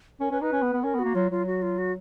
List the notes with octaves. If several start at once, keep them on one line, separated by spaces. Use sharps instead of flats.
C#4 A#4
C#4 B4
D#4 B4
C#4
B3
B3
C#4 A#4
B3 F#4
A#3
F#3 F4
F#3 F4
F#4
F4
F#4